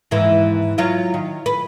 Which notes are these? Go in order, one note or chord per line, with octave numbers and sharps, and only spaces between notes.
D#2 G#2 E3
F#3 F4 F5
D#3
B4